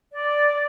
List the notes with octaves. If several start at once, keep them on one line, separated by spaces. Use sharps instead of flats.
D5